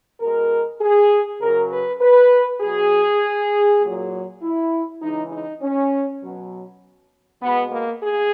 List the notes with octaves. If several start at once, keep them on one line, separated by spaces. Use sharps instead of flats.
B2 G#3 A#4
G#4
C#3 F#3 A#4
B4
B4
B2 F#3 G#4
A#2
F#3
E4
C#3 E3 G#3 D#4
D#4
C#4
B2 F#3
B2 G#3 B3
A#3
G#4